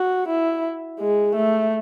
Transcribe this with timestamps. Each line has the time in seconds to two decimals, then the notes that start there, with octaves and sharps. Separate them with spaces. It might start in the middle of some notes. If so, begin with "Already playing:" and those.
Already playing: F#4
0.28 E4
1.00 G#3
1.35 A3